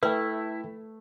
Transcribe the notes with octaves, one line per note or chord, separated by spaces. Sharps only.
A3 E4 A4 B4 G5